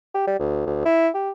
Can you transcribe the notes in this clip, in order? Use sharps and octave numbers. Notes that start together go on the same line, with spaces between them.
G4
G3
D2
D2
E4
G4